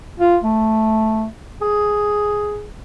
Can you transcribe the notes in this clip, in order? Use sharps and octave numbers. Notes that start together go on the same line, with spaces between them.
F4
A3
G#4